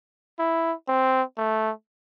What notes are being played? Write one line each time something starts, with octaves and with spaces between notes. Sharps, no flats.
E4
C4
A3